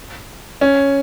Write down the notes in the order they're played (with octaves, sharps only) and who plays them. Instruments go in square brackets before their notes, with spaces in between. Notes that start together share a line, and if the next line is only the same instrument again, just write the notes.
[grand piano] C#4